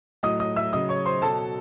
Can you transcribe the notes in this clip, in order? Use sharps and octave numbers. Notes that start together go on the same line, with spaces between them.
A2 F#3 D#5 D#6
D#5 D#6
E5 E6
C#3 F#3 D#5 D#6
C#5 C#6
C5 C6
B2 F#3 A4 A5